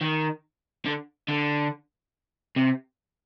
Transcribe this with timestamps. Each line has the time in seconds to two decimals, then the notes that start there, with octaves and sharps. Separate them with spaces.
0.01 D#3
0.86 D3
1.28 D3
2.56 C3